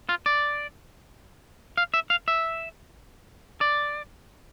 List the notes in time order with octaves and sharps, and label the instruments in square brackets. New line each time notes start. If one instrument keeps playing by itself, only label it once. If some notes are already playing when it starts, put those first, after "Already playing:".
[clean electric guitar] F4
D5
F5
E5
F5
E5
D5